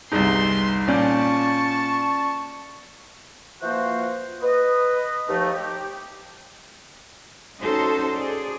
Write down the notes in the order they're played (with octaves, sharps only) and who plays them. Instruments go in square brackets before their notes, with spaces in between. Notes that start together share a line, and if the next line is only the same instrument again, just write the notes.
[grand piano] G1 C2 [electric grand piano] D#4 G#4 [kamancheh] C6
[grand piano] A#2 [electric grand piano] C#4 D5 G6 [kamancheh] A5 C#6
[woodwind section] E3 F3 A#3 F4 F#4 C5
B4 D#5
D#2 F3 A3 D#4
G4
[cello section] C#4 D#4 F#4 A4 C5
G#4 D5